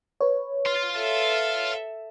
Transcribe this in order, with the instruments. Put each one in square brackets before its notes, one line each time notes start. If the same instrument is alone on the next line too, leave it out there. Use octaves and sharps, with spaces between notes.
[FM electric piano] B4 C#5
[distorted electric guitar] F5 C6
[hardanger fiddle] A4 E5